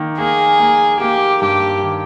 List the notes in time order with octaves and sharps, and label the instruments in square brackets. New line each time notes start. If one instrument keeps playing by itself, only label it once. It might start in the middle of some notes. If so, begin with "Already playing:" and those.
Already playing: [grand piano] D#3 A#3
[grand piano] A#3 [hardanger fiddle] G#4
[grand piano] A#3
[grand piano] A#3 [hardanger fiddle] G4
[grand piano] G2 [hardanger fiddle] G4
[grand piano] D#3